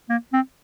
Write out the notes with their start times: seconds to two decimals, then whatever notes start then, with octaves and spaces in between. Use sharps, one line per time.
0.09 A#3
0.33 C4